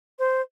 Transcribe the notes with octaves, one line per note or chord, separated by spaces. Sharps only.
C5